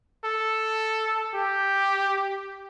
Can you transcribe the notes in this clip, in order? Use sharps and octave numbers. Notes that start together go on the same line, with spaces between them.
A4
G4